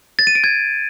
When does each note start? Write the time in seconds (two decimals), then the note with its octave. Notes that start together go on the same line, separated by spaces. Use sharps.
0.19 A6
0.27 D#7
0.35 D7
0.44 G#6